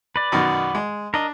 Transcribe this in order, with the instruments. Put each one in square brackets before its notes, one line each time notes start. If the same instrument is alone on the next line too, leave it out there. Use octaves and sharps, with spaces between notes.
[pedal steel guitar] B4 D5
[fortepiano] F#2 B2 D#3
G#3
[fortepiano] D4 [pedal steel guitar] A#4 D#5